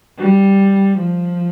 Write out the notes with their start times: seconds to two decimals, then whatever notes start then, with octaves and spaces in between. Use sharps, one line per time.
0.18 G3
0.99 F3